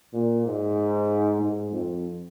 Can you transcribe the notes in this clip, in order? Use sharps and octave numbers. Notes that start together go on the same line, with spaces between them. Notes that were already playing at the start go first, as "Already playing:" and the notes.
A#2
G#2
G#2
F2